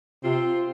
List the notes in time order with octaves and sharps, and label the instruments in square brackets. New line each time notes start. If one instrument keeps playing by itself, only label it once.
[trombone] C3 [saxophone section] C4 F4